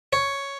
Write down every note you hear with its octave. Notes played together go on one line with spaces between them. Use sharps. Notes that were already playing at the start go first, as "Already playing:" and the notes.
C#5